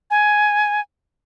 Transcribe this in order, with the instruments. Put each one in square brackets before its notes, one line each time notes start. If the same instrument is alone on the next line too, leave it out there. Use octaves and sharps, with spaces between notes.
[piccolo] G#5